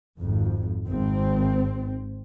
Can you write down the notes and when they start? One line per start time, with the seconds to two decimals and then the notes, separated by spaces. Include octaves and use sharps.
0.21 G#1 F2
0.87 G#1 C4